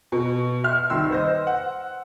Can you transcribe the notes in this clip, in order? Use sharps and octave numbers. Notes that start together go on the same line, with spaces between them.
B2
E5 C6 F6
C2 D#3 C6 E6
B4 C5 D#5
F#5